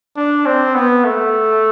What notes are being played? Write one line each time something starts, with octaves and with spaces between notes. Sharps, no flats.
D4
C4
B3
A3